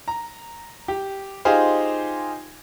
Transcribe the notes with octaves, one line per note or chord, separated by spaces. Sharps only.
A#5
G4
D#4 F4 G4 G#4 C5 F5